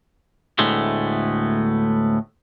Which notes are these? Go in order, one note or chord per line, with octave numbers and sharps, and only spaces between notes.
D2 A2 G#3 A3 B3